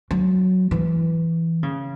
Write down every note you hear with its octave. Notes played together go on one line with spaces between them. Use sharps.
F#3
E3
C#3